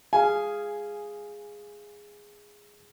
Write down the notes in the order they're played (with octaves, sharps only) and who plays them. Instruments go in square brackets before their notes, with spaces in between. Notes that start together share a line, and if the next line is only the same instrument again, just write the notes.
[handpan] G#4 F5 [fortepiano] G#5